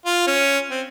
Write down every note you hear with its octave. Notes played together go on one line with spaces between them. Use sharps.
F4
C#4
C4